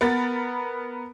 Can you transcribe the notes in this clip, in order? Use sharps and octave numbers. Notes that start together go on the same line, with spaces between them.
B3 A#4 B5 A6